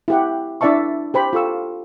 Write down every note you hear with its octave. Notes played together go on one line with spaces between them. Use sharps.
E4 G4 F#5
D4 E4 D5 E5 A5 C#6
G4 C5 B5
F4 A4 C#6 E6